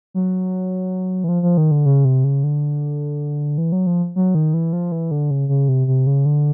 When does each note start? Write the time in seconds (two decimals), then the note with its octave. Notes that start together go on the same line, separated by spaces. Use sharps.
0.14 F#3
1.24 E3
1.29 F3
1.43 F3
1.57 D#3
1.71 D3
1.86 C#3
2.05 C3
2.24 C#3
2.44 D3
3.58 E3
3.72 F#3
3.87 F3
4.16 F#3
4.35 D#3
4.54 E3
4.73 F3
4.92 E3
5.11 D3
5.31 C#3
5.49 C#3
5.68 C3
5.87 C3
6.07 C#3
6.25 D3